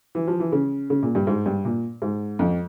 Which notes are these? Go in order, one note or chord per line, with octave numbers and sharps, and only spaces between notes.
E3
F3
E3
C#3
C#3
A#2
G2
G#2
G2
A#2
G#2
F2